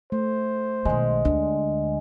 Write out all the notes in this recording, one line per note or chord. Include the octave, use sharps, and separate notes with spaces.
A3 C5
B1 D#3 G#3
D2 D4